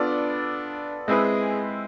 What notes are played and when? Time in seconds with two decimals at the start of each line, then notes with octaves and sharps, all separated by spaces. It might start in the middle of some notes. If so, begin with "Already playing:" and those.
Already playing: B3 D4 F4 A4 D5
1.08 G#3 C4 E4 G#4 B4